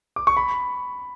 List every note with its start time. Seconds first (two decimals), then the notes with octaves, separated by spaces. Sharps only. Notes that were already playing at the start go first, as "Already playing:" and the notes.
0.16 D6
0.27 C#6
0.37 B5